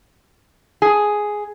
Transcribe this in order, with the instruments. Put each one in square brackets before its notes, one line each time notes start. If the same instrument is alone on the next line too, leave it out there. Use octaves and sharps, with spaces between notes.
[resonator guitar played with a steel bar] G#4